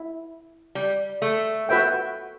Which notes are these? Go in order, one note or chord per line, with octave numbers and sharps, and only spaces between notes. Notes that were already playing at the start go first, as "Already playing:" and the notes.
Already playing: E4
G3
A3
F#4 B4 E5 G5